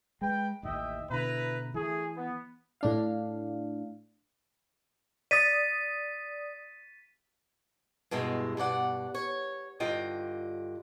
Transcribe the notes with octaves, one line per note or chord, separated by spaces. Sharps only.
G#3 B4 G5
A1 D#2 D#5 E5 G5
B2 D3 E4 B4 A#5
E3 A3 G#4
B3
A2 D4 F5
D5 D#6 A6 B6 D#7
G2 B2 G#3 E4
G2 B2 D5 F#5
C#5
G2 D3 F4 D#5 G5